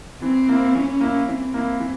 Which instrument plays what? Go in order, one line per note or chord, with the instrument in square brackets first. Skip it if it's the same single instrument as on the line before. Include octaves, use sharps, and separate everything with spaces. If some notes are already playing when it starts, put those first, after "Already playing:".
[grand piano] E3 [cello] C4
[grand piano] A#3 E4
[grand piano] E3 [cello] C#4
[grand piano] A#3 E4
[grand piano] E3 [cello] C4
[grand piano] A#3 E4
E3